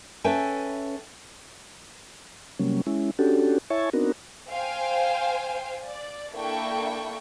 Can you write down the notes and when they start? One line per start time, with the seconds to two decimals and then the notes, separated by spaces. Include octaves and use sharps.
0.24 C#4 A4 B4 E5 G5 G#5
2.59 C3 F#3 G3 A#3 C#4
2.87 G#3 C#4 E4
3.19 C#4 D4 F#4 G4 A4
3.70 E4 C#5 E5 G#5 A5 C#6
3.93 B3 C4 D4 D#4 F#4 A#4
4.52 C5 F5 G5 G#5
5.86 D5
6.33 A#3 D4 E4 A4 G5 C#6